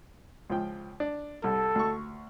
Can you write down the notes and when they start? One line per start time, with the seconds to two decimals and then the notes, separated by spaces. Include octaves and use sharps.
0.50 C#2 F3 G5
1.00 D4
1.44 C2 A4
1.75 D2 C#6